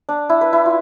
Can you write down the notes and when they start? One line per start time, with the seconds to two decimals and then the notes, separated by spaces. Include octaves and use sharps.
0.09 D4
0.29 E4
0.41 B4
0.53 E4
0.66 F4